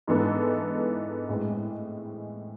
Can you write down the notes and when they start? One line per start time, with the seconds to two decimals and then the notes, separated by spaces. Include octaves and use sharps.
0.07 G#2 E3 B3 D4 A4
1.29 A2 G#3 C4